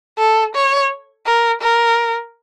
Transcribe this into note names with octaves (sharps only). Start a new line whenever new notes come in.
A4
C#5
A#4
A#4